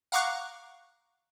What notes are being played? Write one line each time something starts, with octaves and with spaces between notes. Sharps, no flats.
F5 F#5 A#5 C#6 D6 F#6